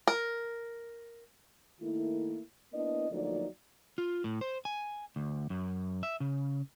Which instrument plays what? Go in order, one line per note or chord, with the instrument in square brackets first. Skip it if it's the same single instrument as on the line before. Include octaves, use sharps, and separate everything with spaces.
[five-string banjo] A#4
[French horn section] D#3 A3 A#3 E4
A#3 B3 D4 E4 D#5
D2 F3 F#3 A#3 D#4 D5
[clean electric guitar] F4
A2
C5
G#5
D2
F#2
E5
C#3